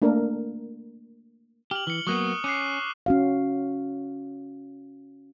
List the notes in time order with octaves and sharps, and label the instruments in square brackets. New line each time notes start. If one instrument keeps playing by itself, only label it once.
[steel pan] A3 A#3 D4 A4 A#4
[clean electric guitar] G4 [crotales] F6 F#7
[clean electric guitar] E3 [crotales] C#7 G7
[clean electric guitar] F#3 A#3 B3 [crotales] C#6 D#6 F#6
[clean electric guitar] C#4 [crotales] D6 F#6 C7
[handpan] C#4 F#4 F5